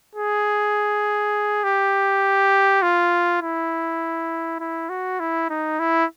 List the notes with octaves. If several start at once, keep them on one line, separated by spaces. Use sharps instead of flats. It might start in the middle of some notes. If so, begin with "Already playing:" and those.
G#4
G4
F4
E4
E4
F#4
E4
D#4
E4